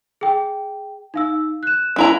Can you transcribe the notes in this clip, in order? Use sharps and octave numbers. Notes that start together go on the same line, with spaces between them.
G#4 G5
D#4 F5 E6
F#6 E7
C#4 E4 A#5